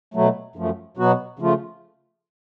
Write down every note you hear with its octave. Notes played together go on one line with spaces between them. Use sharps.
B2 F#3 A3
F#2 F3 A3
B2 F#3 B3 F#4
C#3 F3 A3 F4